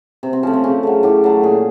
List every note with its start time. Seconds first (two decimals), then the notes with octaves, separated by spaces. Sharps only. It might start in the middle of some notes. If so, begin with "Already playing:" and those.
0.23 C3
0.33 C4
0.43 F3 A3 C#4
0.54 C4
0.64 C#3 C#4
0.83 F#3 A3
1.03 A2 G4
1.24 F#3 A3
1.43 A#2 G#4